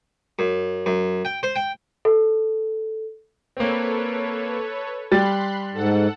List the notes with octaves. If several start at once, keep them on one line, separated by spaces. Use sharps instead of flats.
F#2
F#2
G5
C5
G5
A4
A#3 C4 A4 B4 C#5
G3 B5 C6 F#6 A6
G#2 A4 F#5